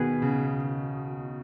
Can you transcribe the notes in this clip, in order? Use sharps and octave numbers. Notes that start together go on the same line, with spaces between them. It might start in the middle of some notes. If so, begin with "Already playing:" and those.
Already playing: B2 D#3 B3 G#4 B4
C#3